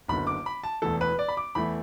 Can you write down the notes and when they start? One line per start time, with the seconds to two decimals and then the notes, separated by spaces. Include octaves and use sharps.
0.08 F#1 F#2 D3 B3 B5
0.27 D6
0.46 B5
0.64 A5
0.82 E1 E2 E3 A3 A4
1.01 B4
1.19 D5
1.28 B5
1.37 D6
1.55 E2 E3 A3 B5